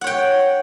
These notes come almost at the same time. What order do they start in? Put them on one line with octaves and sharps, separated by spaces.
F#5 C#5 G5